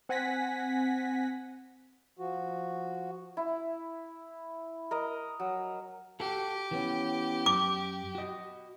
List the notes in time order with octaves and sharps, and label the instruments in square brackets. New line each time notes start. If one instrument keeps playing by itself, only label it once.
[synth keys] C4 F#5 G#5 A#6 B6
[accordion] F3 F#4
[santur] E4
A#4 D#5
F#3
[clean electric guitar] F#4 A4 [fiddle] G4
[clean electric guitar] E3 B3 C#4
[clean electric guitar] F#2 [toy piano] D6
[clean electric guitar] F#4 D#5